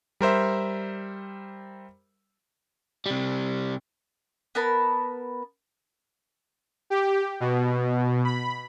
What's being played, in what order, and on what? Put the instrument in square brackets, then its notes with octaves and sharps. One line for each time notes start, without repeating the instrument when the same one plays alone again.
[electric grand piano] G3 A#4 C5 E5
[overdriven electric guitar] C3 G3
[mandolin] B3 A#4 A5 B5
[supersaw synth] G4
B2
B5